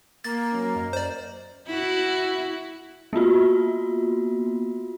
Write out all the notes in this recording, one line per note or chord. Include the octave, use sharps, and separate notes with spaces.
A#3 A6
F#3 C#4
F#2 D#5 A#5
C5 D5
E4 F#4
A#3 B3 F4 F#4